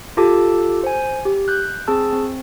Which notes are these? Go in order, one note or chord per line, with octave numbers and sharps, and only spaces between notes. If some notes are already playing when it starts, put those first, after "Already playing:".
F4 G4 A4 A5 D6
C5 G#5
G4
F#6 G6
C4 G#4 A5 E6
C4